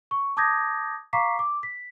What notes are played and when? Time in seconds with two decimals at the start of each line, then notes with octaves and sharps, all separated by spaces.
0.11 C#6
0.37 A5 D6 D#6 G6 G#6 A#6
1.13 F5 A#5 C#6 D6 B6 C7
1.39 D6
1.63 B6